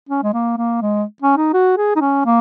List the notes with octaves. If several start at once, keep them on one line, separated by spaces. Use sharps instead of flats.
C#4
G#3
A#3
A#3
G#3
C#4
D#4
F#4
G#4
D#4
C#4
A#3